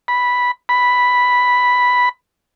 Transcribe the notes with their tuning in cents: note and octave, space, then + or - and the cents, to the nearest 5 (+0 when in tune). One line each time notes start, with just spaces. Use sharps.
B5 -5
B5 +0